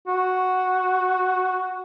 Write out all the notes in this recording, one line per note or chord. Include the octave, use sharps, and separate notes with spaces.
F#4